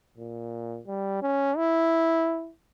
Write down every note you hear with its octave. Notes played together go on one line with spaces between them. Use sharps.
A#2
G3
C#4
E4